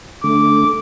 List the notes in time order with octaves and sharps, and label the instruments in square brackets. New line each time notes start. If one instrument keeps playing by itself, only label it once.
[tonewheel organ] D3 A3 [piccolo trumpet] D6